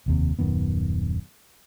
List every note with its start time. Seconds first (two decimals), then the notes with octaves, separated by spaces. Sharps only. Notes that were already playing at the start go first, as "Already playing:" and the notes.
0.06 F1 D#2 C3
0.39 D#1 F#2 D#3 B3